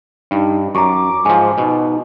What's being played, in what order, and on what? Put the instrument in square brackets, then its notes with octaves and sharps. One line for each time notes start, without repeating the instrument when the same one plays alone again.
[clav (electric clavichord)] G2 [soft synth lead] D#4
[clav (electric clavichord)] F#2 [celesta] A#5 C#6 [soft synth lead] D6
[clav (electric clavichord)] G#2 F3 [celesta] G#5
[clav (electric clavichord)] B2 [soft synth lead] D#4